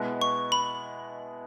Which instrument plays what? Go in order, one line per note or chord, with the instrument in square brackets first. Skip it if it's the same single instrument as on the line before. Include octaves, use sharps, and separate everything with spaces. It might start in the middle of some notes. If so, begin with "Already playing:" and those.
Already playing: [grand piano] B2 G#3 B3 E4
[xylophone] C#6
B5